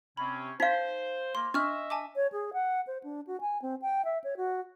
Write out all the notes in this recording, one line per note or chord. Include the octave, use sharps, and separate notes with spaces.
C3 C4 C#4 B5
D#4 C5 F5 B6
A#3 C6
D4 D#5 E5 C#6 F6
G#5 A5 D6
C#5
G#4
F#5
C5
D4
F#4
G#5
C4
G5
E5
C#5
F#4